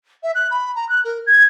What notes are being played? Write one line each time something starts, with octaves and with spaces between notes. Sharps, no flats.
E5
F#6
B5
A#5
F#6
A#4
G#6